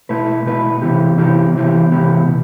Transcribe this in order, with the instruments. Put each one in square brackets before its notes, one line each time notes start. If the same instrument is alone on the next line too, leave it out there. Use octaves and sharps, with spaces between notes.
[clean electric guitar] B2 A3 E4 B4
B2 A3 E4 B4
C3 E3 B3 E4 G4
C3 E3 B3 E4 G4
C3 E3 B3 E4 G4
C3 E3 B3 E4 G4
B2